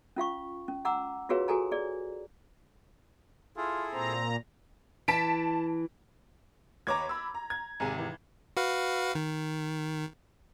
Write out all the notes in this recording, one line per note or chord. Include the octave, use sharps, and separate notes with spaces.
C#4 F4 F5 C#6
C#4
F#5 A#5 D6 E6
F4 F#4 G#4 B4 C#5 F5
F#4 G#4 A4 G#5 A#5
G#4 D5
E4 F4 G#4 A4
A#2 C4 A#5
E3 A5 B6 D7
D#2 B4 C#5 A#5 D6 G#6
B5 E6
A#5
G#6
G#1 C3 G#4 G#5 A#5
E3
F#4 B4 F5
D#3